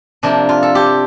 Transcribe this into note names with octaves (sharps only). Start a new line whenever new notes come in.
C3 F3 A#3 D4
F4
A4
G4